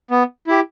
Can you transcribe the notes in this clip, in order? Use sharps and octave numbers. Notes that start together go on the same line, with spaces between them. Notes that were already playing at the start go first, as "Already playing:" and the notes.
B3
E4 G4